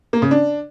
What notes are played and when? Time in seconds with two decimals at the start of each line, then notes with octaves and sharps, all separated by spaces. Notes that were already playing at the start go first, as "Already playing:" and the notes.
0.13 A#3
0.22 C#3
0.31 D4